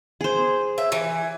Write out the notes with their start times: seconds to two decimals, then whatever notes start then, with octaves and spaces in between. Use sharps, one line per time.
0.21 G#4 C5
0.78 E5
0.92 E3